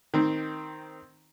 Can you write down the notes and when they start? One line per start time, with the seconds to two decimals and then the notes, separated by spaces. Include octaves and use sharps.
0.14 D#3 C4